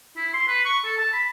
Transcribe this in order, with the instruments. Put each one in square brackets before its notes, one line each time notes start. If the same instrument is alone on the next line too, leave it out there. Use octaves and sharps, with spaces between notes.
[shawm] E4
C6
B4
C#6
A4
A5
B5